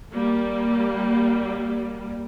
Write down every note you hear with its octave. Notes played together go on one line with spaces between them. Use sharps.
G3 A#3